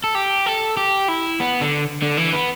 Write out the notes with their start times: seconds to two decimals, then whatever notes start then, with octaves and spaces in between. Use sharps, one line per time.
0.04 A4
0.15 G4
0.46 A4
0.77 G4
1.08 E4
1.40 B3
1.61 D3
2.02 D3
2.18 E3
2.33 B3